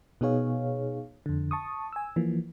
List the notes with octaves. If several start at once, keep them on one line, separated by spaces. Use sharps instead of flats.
B2 B3 D#4 G#4 C#5 F5
F2 D3
A5 C#6 D#6
G#5 E6
E3 F3 A#3